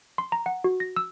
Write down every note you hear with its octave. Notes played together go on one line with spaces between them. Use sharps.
C6
A#5
F#5
F#4
A#6
E6